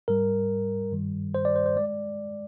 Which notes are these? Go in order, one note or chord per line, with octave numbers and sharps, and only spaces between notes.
G#2 G3 A#4
G2 D#3 G3
C5
D5
C5
C5
G#3 D5